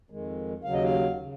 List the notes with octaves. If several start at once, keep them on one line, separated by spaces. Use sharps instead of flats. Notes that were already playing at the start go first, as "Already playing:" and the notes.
F2 D#3 G#3
D#2 C#3 F#3 F5
D#5
F5
C#3